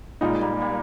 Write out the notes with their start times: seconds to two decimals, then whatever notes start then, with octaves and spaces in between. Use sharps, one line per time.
0.21 A#2 G3 G#3 A#3 D#4
0.41 G3 A#3
0.61 G3 A#3